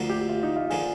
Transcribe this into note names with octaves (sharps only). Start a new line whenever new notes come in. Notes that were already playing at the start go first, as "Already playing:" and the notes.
Already playing: D2 D3 F3 A#3
G4
F4
D#4
F4
D3 F3 A#3 G#4